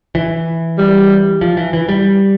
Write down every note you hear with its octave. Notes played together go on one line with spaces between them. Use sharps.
E3
G3
F3
E3
E3
G3